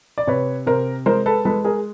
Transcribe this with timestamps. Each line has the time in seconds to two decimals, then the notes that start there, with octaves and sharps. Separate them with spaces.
0.18 D5
0.27 C3 B4 C#5
0.66 C3 A#4 C5
1.06 G#3 A#4 C5
1.26 A4 B4
1.45 G#3 A4 B4
1.65 G#4 A#4